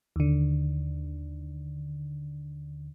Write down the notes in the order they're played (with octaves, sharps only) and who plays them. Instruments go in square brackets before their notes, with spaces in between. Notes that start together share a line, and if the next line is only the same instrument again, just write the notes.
[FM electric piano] D#2 D3